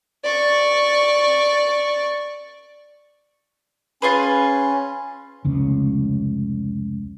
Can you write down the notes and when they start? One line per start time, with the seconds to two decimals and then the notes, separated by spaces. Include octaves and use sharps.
0.25 D5 C#6
4.02 C#4 F4 G#4 B4
5.44 F1 C#2 C#3